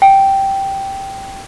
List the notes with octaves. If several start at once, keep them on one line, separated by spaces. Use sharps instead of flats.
G5